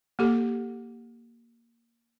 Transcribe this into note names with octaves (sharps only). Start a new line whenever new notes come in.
A#3 G4 A4